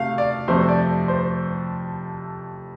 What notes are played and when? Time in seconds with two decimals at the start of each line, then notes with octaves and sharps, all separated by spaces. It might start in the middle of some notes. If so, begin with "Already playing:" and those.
Already playing: C3 A3 F5
0.18 D5
0.48 F2 C3 A3 C5
0.69 D5
1.08 C5